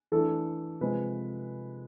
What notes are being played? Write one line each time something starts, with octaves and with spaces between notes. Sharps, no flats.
E3 A3 D4 A4
C3 F3 G#3 B4